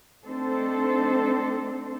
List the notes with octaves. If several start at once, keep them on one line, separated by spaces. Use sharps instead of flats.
A3 C4 D4 D#4 A4 C5